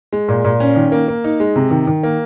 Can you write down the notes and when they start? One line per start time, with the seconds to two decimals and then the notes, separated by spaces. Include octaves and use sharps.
0.13 G#3
0.28 A#2
0.45 A#2
0.60 C#4
0.76 D#3
0.92 A#3
1.08 A#3
1.24 D#4
1.40 G#3
1.56 C3
1.71 D#3
1.87 D#3
2.03 A#3